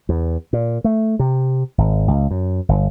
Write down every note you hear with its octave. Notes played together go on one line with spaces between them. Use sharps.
E2
A#2
A3
C3
G#1
C#2
F#2
G1